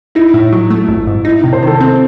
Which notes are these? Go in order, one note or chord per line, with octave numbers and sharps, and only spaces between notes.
D#4 E4
A2
F#3
A3
G#1
G#2
D#4 E4
C3
C5
D#3 A4
C4